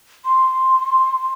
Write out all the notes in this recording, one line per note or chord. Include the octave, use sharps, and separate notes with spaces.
C6